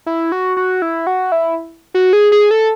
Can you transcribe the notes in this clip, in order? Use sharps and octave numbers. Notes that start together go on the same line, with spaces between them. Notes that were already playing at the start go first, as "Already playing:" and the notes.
E4
F#4
F#4
E4
F#4
E4
F#4
G#4
G#4
A4